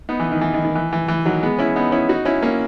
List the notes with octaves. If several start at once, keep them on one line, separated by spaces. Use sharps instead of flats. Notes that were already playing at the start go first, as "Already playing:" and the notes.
B3 D#4
E3
D#3
E3
D#3
D#3
E3
E3
E3
D#3 F#3
G#3 B3
C#4 E4
B3 D#4
C#4 E4
D#4 F#4
C#4 E4
A#3 C#4